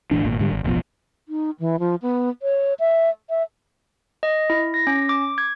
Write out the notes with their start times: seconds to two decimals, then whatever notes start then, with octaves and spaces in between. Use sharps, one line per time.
0.11 G#1 A2 E3 D4
0.25 G#1 A#2
0.39 G#2 D3 G3
0.52 G#1
0.64 E1 A1 B2 F3
1.28 D#4
1.60 E3
1.79 F3
2.02 B3
2.42 C#5
2.80 E5
3.30 E5
4.23 D#5
4.50 E4
4.74 A#6
4.87 C#4
5.09 D6
5.38 G#6